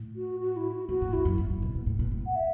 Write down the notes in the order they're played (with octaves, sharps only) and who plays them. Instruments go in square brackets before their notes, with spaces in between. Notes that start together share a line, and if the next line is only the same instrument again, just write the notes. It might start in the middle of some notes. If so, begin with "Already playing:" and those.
Already playing: [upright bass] A2
[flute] F#4
F#4
E4
F#4
[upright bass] A2 [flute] F#4
[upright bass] G#2
[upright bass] E2 [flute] E4
[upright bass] F#2
G#2
G#2
B2
B2
A2
B2
A2
[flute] F#5
E5